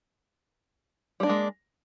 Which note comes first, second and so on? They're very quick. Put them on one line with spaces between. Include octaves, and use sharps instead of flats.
G3 D4 A#3 G#3